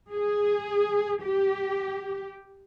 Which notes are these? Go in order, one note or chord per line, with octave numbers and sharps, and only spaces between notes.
G#4
G4